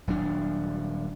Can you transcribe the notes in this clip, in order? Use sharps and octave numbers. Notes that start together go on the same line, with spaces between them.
D#1 F#3 D4